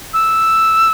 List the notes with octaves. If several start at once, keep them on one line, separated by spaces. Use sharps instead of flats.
E6